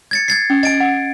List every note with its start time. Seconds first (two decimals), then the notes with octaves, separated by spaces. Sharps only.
0.11 G#6 A6 C#7
0.28 G#6 A6 C7
0.50 C#4
0.63 D#5 G#5 A6 D7
0.80 F#5